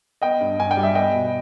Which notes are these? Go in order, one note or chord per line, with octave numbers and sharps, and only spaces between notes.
B3 D#5 G5
G2
G2 G#5
G5
G3
E5
B3 D#5 G5
B2